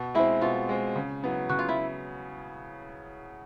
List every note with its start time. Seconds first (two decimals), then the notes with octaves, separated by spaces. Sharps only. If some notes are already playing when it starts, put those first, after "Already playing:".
Already playing: B2
0.15 G#3 C4 E4
0.41 B2 F4
0.69 G#3 C4
0.96 C#3
1.23 F#3 B3 E4
1.49 C#3 F#4
1.59 F4
1.69 E4